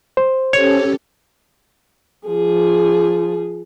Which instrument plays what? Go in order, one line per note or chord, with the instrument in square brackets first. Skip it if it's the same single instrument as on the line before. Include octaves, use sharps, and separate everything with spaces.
[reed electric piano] C5
[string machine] C#4 G4 A4 [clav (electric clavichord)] C#5
[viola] F3 G#4